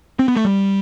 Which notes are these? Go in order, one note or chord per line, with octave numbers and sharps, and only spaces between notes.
C4
B3
A3
G3